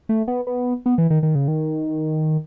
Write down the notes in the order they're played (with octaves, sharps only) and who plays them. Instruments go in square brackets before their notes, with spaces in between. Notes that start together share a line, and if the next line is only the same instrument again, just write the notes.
[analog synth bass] A3
B3
B3
B3
E3
D#3
D#3
C#3
D#3